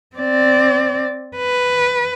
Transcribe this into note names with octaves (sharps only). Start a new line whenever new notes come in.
C4 D5
B4